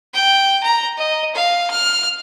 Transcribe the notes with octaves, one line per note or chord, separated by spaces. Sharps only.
G5
A#5
D#5
F5
F6